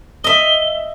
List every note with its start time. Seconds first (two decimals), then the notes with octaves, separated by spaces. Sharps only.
0.24 D#5 E5 G7